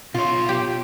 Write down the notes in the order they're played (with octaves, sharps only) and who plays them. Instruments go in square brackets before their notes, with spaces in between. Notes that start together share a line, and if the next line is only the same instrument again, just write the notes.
[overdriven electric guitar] B2 C#5 [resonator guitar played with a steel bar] F4
[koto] G4